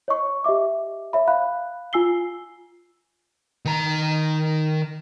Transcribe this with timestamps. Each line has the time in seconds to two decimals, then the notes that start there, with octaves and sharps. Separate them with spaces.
0.08 C#5 D#5 C#6
0.44 G4 D#5 E5 D6
1.13 C#5 E5 B5
1.28 F5 B5 F#6
1.93 F4 G#5 E6 C7 G7
3.65 D#3 A#5